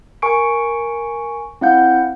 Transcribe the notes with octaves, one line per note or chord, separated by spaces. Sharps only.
A#4 G#5 C#6 C#7 D7
C4 E4 F5 F#5 G6